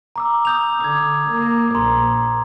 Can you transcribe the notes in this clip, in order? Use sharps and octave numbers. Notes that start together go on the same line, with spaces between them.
A#5 D6 E6
D#6 G6 F7
D3 D6 G#6
A#3
A#1 A#5 C6